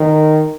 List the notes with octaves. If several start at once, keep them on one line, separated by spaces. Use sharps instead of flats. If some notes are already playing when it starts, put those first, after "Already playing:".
Already playing: D#3